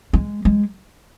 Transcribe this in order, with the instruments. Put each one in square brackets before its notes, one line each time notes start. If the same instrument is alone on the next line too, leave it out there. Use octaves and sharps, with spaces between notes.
[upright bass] G#3
G#3